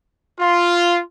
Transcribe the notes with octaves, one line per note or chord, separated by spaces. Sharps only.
F4